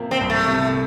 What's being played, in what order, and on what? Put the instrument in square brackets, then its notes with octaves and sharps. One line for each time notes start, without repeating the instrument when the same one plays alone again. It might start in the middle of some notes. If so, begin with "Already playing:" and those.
Already playing: [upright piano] C3 F3 A#3
[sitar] C4
[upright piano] C2
[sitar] A3
[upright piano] C3